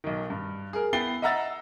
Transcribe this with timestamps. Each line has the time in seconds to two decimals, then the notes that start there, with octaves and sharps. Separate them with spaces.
0.04 B1 D#3
0.30 G2
0.73 G#4 A#4
0.93 B3 E4 G5 A6 C7 G7
1.22 D#5 E5 F#5 A#5 E6 A6